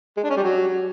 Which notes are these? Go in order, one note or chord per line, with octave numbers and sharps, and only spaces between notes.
G#3
D4
C#4
G3
F#3